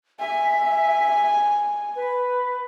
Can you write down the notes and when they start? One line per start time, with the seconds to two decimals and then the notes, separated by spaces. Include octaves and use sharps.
0.20 E5 G#5
1.95 B4